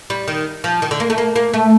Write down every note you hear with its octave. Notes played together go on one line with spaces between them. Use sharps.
G3
D#3
F3
D#3
D3
A#3
A3
A#3
A#3
A3